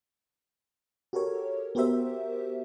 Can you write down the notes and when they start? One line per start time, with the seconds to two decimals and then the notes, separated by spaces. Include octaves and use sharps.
1.13 F#4 G4 A4 A#4 C#5
1.75 B3 F#4 G4 A#4 C5 E5